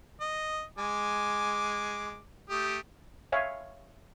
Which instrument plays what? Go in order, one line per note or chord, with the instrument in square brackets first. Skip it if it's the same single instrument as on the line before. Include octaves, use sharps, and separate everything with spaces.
[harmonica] D#5
G#3 G#5 D6
A3 G4 D#6
[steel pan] C#5 E5 F5 G#5